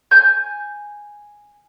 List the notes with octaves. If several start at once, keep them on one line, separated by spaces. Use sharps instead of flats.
G#5 G6